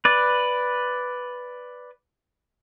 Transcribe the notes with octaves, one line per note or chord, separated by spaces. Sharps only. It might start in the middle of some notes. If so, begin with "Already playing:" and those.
B4 D5